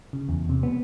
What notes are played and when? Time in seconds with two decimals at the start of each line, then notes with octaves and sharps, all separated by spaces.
0.13 C#3
0.29 E2
0.49 C3
0.63 B3